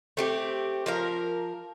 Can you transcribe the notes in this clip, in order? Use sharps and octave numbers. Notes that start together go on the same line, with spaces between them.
A3 C4 G4
F3 A#4 F5